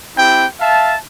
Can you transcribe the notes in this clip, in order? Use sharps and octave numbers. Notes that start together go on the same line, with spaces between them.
C4 E4 G4 G5
E5 F5 A5